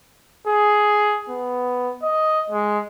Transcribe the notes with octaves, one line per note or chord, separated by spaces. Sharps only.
G#4
B3
D#5
G#3